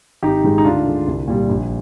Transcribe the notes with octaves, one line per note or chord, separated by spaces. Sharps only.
G#1 D#4 G4
G#2 D#3 G#3
D#4
D2 D4 F4
D3 G#3
C2
A#2 G3
A#1